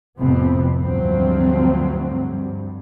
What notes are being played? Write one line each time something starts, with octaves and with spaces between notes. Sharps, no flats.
F1 F2 A2 C3 B3 C4
D2 G2 F3 F#3 A3 C4
G2